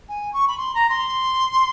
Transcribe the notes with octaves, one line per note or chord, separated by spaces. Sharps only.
G#5
C#6
B5
C6
A#5
C6